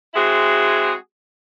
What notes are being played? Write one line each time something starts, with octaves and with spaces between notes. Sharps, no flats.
G#3 C4 E4 F#4 G#4